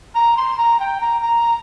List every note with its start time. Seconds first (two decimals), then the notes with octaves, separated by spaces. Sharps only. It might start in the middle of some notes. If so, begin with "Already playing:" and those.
0.15 A#5
0.37 C6
0.57 A#5
0.80 G5
1.01 A#5
1.21 A#5